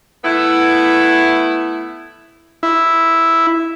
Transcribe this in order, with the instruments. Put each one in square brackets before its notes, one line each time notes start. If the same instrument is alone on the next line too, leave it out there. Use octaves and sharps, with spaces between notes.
[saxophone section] A3 B3 E4
[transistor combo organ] E4